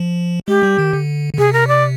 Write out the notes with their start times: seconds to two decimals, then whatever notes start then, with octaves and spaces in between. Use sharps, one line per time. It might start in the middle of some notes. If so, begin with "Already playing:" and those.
Already playing: F3
0.48 G#3 G4
0.63 G3
0.79 D#3
0.93 D3
1.34 D3
1.38 C3 G#4
1.53 A#4
1.68 D5